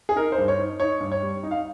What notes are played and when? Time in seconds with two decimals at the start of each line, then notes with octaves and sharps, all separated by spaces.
0.09 G#4
0.16 D#4 A#4
0.32 C5
0.38 G2
0.48 C#5
0.59 D#4
0.80 D#4 C#5
1.00 G2
1.12 C#5
1.23 G3
1.43 D#4
1.51 F5